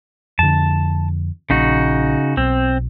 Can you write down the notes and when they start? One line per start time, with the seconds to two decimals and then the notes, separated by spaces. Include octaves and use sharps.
0.39 F2 D3 A5
1.50 A#1 C#3 D#4 F#4
2.37 B1 C4